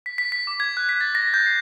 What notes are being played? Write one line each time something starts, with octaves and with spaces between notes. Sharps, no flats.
B6
B6
B6
D6
G#6
F#6
B6
A6
A#6
G6
C7